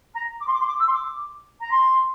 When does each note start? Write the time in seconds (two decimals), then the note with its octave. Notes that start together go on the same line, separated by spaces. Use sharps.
0.14 A#5
0.40 D6
0.47 C6
0.53 D6
0.60 C6
0.66 D6
0.79 E6
0.87 C6
0.93 D6
1.60 A#5
1.71 C6